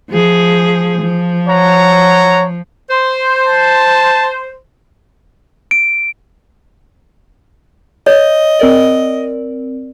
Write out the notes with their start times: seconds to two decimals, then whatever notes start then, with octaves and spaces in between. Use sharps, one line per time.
0.10 F3 G#4
1.01 F3
1.48 C#5 F#5 A#5
2.91 C5
3.46 A5
5.71 D7
8.07 C#5 D#5
8.59 C4 A#4 D5